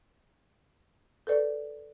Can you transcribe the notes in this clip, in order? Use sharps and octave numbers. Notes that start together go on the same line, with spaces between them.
A4 B4 D5